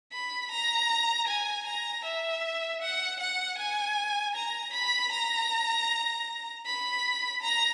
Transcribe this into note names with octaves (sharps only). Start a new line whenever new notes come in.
B5
A#5
G#5
A#5
E5
F#5
F#5
G#5
A#5
B5
A#5
B5
A#5